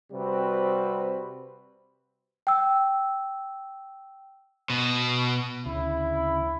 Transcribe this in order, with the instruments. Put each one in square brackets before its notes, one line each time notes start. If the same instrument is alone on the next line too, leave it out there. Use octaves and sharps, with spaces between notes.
[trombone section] C3 G3 C4 F#4 B4
[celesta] G5 E6
[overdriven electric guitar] B2
[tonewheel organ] D2 C#3 [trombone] E4